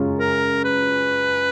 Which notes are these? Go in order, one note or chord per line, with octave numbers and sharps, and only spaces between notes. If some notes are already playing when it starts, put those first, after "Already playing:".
Already playing: F#2 C#3 G#3 C#4 F4
A#4
B4